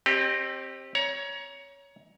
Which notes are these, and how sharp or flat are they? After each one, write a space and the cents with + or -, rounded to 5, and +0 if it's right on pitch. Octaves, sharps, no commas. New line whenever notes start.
C4 +20 G4 +0 D#5 -45
C#5 +15 A#5 +30